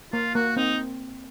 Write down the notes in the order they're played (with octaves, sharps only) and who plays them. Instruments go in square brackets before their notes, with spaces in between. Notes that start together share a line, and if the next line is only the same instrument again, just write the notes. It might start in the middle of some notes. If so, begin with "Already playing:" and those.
[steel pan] A#3 [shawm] F4
[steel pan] A#3 [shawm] F#4
[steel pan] C4 [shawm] D#4